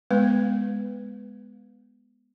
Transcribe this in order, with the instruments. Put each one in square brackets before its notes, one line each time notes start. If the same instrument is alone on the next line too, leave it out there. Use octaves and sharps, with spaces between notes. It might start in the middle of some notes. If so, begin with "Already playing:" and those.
[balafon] G#3 B3 B4